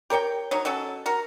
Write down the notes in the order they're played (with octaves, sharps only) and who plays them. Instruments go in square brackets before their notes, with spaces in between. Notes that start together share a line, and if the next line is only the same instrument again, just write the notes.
[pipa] G4 A#4 C#5 G5
F#3 D#4 C#5
B2 F#3 C#4 A4
F#4 A#4